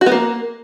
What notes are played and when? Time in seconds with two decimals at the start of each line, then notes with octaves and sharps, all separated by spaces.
0.01 F#4
0.06 B3
0.12 A#3